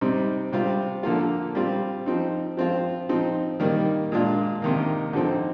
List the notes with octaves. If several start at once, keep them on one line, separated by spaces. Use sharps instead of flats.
C3 G3 C4 D#4
C3 G3 C4 F4
D3 F3 A#3 F4
G3 C4 F4
F3 C4 D#4
F3 C4 F4
F3 C4 D#4
D#3 G3 A#3 D#4
A#2 G#3 D4 F4
C3 D#3 A#3
D3 F3 C4 D#4